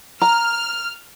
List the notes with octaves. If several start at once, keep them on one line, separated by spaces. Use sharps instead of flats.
A#5 F6